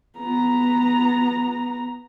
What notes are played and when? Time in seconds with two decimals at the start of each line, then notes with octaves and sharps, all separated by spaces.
0.19 B3 A#5